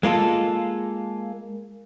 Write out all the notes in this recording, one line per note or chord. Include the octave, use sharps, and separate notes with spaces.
G#3 A#3 F4 A4